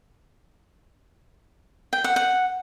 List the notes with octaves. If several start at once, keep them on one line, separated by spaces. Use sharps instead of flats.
G5
F#5
F#5